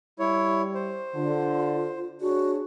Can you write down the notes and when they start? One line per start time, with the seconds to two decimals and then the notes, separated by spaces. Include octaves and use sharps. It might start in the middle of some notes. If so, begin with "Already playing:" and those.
0.19 G3 E4 C#5
0.75 C5
1.14 D3 F4
2.21 D4 F#4 G#4 C#5